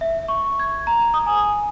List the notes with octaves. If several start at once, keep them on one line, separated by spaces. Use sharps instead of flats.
E5
C#6
G#6
A#5
D#6
G#5